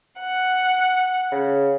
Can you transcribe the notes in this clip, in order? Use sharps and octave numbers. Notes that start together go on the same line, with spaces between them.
F#5
C#3